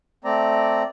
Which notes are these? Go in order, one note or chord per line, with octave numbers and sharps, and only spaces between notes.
A3 C4 D5 A#5